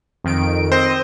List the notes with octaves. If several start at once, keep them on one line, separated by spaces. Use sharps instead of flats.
F2 D#3 D7
C4 C5 D#5